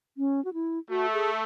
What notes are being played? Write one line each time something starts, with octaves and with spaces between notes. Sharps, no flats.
C#4
F#4
E4
A3 F#4
G#4